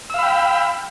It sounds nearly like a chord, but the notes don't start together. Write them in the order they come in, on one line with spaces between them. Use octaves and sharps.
E6 F5 B5 G5